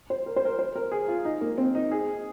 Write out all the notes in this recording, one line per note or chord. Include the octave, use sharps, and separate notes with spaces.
C5
A#4
C5
A#4
C5
A#4
G#4
F4
D#4
A#3
C4
D#4
G#4